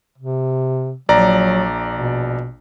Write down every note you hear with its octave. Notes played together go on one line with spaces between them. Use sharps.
C3
A#1 F#3 D5 A#5
B2